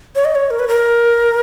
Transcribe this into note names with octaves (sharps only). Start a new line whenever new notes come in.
C#5
D#5
C#5
A#4
B4
A#4